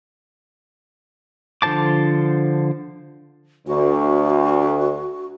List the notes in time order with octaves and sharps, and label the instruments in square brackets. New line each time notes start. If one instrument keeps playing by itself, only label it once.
[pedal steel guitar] D3 F3 C5 A5 D6
[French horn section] D2 [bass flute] F#4